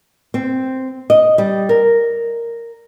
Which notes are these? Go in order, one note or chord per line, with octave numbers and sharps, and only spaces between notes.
C4
D#5
G3
A#4